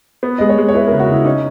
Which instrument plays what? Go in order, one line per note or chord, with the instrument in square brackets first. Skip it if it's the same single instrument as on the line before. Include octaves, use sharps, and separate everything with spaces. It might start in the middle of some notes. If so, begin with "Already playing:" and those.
[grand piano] B3
[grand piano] G#3 [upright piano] D#5
[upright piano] C#5
[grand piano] G#3
[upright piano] C#5
[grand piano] E4 [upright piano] B4
[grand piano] C#3 [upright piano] A#4
[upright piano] F#4
[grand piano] C#3 [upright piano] E4
[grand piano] C#4 [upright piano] D#4